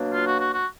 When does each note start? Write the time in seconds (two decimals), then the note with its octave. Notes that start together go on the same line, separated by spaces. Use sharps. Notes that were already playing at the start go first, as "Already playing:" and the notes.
Already playing: B2 F#3 A#3 D4
0.11 F4
0.24 F#4
0.38 F#4
0.51 F#4